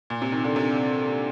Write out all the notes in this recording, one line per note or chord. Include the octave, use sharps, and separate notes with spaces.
A#2
C3
D#3
D3
C3